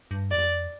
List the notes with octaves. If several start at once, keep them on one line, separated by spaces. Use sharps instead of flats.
G2
F2 D5